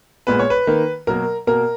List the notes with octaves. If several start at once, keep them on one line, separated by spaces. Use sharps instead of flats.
A#2 G#3 B3 B4
C#5
B4
D#3 A#3
B2 F#3 A#3 A#4
B2 A#3 A#4